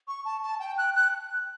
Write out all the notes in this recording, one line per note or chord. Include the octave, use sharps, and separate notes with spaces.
C#6
A5
A5
G5
F#6
F#6